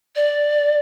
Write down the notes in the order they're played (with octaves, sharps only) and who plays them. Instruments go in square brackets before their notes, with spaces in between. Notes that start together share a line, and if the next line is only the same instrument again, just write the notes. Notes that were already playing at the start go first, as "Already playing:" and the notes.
[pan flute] D5